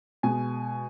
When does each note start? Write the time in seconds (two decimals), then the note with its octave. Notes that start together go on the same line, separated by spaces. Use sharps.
0.23 B2 G#3 G#5